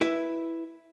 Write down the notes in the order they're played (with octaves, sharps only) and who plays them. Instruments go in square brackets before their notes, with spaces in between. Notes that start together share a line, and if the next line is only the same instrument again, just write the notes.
[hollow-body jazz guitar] E4 B4 E5